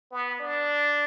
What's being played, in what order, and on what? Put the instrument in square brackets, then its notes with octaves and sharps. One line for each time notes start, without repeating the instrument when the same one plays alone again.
[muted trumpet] B3
D4